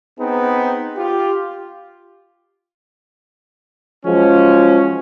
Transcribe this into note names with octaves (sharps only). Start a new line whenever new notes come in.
B3 C4 D#4 G#4
F4 G4
F3 F#3 G#3 C#4